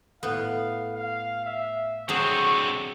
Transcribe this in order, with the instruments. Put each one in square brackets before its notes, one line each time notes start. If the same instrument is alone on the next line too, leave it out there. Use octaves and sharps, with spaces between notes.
[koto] A2 B3 [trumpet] F5
[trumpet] F5
E5
[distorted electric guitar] D3 C4 [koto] F#3 G#4 [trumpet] C#6